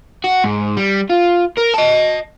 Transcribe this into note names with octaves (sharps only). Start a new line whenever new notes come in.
F#4
G#2
G3
F4
A#4
D#5 A5